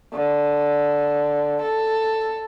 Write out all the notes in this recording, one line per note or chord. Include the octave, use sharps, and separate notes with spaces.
D3
A4